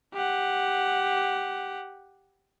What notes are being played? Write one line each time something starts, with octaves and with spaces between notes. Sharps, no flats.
G4 F#5